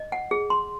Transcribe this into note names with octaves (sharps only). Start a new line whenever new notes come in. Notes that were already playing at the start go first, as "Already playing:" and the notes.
Already playing: D#5
F#5
G#4
C6